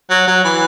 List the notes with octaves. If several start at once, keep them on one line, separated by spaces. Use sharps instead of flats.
F#3
F#3
E3